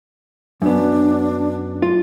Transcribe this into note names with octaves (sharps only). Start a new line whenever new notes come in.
F#2 B3 D4
F4